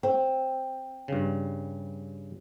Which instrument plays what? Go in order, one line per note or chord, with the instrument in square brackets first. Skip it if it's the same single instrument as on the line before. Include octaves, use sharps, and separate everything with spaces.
[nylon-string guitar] C4
[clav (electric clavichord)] G2 C#3